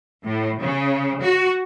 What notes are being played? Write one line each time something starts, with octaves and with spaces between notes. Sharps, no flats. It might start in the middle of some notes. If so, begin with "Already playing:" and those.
A2
C#3
F#4